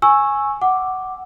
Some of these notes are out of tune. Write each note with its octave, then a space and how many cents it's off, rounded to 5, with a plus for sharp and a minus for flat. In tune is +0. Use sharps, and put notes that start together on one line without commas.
G#5 +0 C#6 -15 E6 +0
F#5 +10 D6 +0